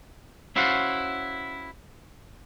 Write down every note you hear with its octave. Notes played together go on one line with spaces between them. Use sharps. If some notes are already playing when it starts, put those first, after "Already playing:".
C#4 E4 F#4 C5 F5 F#5